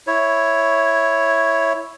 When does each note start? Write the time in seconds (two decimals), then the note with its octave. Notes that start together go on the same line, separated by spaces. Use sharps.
0.07 E4 C#5